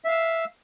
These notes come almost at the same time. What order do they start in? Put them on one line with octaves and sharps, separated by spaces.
E5 F5 E6